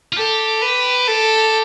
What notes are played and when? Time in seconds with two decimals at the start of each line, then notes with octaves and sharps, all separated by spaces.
0.13 F4
0.17 G4 A4
0.62 B4
1.08 A4